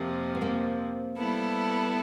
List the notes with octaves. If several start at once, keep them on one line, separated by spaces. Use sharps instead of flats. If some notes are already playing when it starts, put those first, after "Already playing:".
Already playing: F2 C3 F3 A#3 C4
B3
A#3 C4
G3 B3 E4 A4